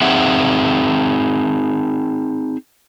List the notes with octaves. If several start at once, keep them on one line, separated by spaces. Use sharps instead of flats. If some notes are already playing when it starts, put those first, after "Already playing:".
C4 D#4 G#4 E5 F#5